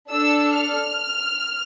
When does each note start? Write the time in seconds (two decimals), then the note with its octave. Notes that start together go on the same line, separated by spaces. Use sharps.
0.10 D4 A4 E6
0.57 F6